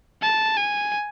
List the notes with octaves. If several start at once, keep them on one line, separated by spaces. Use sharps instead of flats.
A5
G#5